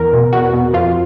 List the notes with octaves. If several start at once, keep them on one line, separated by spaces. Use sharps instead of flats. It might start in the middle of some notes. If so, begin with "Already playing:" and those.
Already playing: E2 A#4
B2
E2 F#4
B2
F2 F4